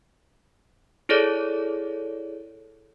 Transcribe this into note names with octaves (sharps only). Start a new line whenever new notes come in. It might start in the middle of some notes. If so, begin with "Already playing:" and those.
E4 G#4 A4 C#5 D5